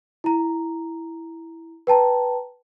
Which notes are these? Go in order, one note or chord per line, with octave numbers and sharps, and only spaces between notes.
E4 A#5
B4 G5 A5 A#5